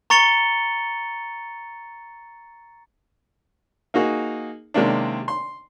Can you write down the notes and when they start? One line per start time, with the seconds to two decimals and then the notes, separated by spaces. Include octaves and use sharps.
0.10 A#5 C#6 A6 C#7 F7 G7
3.94 A#3 D#4 F#4 G#4
4.74 C3 D#3 G#3 A#3 C#4 D4
5.28 C6